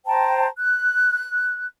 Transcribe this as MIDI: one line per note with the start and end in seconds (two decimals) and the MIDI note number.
0.06 0.47 72
0.06 0.47 79
0.06 0.47 81
0.06 0.47 82
0.58 1.65 90